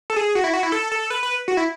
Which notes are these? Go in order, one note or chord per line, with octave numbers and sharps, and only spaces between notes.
A4
G#4
F#4
E4
F#4
E4
A4
A4
B4
B4
F#4
E4